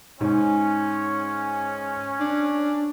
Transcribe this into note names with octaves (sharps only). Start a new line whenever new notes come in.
G#2 C#4
D4